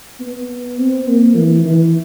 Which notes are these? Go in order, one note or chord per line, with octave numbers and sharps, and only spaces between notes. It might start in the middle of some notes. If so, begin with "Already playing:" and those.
B3
C4
A#3
E3
E3